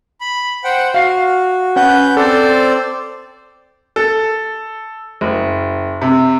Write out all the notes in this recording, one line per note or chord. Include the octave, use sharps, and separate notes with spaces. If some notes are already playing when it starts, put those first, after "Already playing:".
B5
C5 F#5 G5
F#4 F5 C7
C#4 B4 F#5 G6
C4 A4 C5 D5
A4
F#1
C3